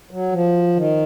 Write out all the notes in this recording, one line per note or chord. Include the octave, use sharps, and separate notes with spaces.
F#3
F3
D#3